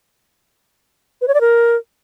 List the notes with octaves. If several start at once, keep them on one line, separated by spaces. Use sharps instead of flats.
B4
C#5
D5
A#4